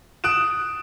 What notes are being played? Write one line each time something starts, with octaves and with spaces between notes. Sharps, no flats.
D#6 F#6 D7 E7